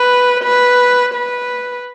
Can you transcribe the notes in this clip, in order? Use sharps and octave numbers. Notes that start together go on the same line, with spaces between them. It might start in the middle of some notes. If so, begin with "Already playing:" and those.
Already playing: B4
B4
B4